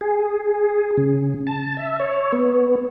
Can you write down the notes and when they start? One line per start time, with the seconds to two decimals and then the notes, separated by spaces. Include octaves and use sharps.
0.01 G#4
0.97 C#3
1.47 A5
1.77 E5
2.00 C#5
2.33 B3